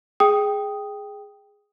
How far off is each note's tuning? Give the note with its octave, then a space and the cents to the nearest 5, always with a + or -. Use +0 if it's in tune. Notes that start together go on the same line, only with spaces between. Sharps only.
G#4 +0 G5 +0 D#6 +0